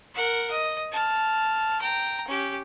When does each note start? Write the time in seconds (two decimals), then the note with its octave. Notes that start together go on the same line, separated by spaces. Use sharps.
0.15 A#4 F#5
0.51 D#5
0.92 A5 F6
1.81 G5 A#5
2.28 C#4 G4